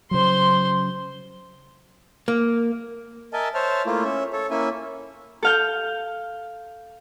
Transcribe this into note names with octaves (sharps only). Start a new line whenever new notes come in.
C#3 F#3 C5 C6
A#3
A#4 D#5 E5 G#5 A5
C5 C#5 E5 A5 F6
A3 A#3 E4 F4
C#4 E5
A4 C#5
A#3 C#4 E4 E5 G#5
A4 F5 G6